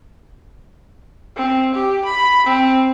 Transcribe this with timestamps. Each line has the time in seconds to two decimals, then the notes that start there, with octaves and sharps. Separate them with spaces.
1.36 C4
1.74 G4
2.04 B5
2.47 C4